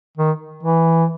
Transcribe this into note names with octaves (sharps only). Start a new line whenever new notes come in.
D#3
E3